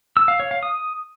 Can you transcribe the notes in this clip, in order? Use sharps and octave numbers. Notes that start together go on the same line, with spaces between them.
E6
F5
C#5
F5
D#6